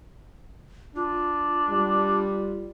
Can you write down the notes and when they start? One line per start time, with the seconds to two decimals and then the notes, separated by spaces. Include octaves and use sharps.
0.96 D4 F4
1.70 G3